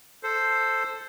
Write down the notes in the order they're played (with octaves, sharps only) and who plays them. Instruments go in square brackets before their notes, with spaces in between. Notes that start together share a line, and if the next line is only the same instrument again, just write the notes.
[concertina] A4 C5